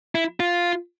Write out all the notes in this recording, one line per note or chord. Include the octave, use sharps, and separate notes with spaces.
E4
F4